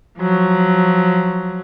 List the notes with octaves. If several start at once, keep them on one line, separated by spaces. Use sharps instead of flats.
F3 F#3